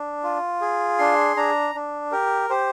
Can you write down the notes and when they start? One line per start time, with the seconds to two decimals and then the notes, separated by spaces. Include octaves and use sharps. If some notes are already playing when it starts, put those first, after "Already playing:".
Already playing: D4
0.24 F4
0.61 G#4
0.99 D4 C6
1.36 D4 A#5
1.75 D4
2.12 G4 A#4
2.50 G4 C5